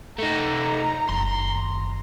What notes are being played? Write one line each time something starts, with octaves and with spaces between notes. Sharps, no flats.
A3 D#4 A#5
F#1 D#3 C6